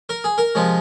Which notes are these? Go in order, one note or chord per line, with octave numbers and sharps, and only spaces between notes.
A#4
G#4
A#4
C3 F3 G#3